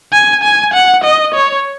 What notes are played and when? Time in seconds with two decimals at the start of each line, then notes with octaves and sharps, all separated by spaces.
0.13 G#5
0.43 G#5
0.74 F#5
1.04 D#5
1.34 C#5